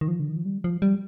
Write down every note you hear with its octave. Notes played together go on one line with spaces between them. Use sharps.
D#3
F3
D3
D#3
F3
G3
F3
G3